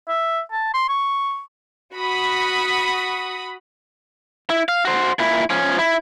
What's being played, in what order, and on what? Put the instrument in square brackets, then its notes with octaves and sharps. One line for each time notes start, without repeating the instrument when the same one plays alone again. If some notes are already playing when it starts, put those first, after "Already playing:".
[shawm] E5
A5
C6
C#6
[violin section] F#4 B5 D#6
[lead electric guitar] E4
F5
F#4 C5
A#2 E4
F3 C#4
E4